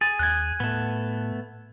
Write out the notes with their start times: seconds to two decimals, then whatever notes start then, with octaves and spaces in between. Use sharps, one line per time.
0.01 G#4 A6
0.19 D#2 F#6 G#6
0.60 A2 A3 B3